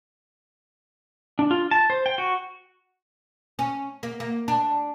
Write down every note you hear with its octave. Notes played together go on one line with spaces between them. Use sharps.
D4
F4
A5
C5
G5
F#4
C#4
A#3
A#3
D4